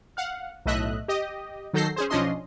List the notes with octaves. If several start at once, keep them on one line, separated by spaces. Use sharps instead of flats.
F5 F#5
B1 A2 A3 D#5 E5 F#6
G4 D#5
D#3 F#3 A4 G6 A#6 C7
C#4 G#4 C5
B1 F3 C#4 D4 D#5 C6